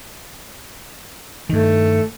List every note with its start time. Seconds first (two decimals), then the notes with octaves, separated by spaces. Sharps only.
1.49 G2 D#3 A3